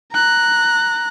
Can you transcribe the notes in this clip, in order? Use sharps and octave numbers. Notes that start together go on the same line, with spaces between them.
A#5 F#6